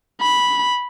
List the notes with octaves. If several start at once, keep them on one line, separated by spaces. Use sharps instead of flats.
B5